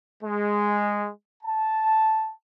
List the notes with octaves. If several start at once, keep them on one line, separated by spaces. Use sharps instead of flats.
G#3
A5